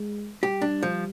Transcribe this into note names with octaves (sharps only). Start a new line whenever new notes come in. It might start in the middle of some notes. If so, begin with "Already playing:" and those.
Already playing: G#3
G3 G4
D4
F3